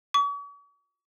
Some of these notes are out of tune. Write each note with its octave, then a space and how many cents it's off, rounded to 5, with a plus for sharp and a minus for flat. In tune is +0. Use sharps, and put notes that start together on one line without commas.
C#6 +45